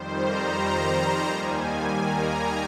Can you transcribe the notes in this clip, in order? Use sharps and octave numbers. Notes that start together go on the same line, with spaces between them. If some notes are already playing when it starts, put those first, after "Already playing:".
Already playing: F2 D#3 G3 C5
A#5
D#2 D#3 G3 A#3 G#5
A#5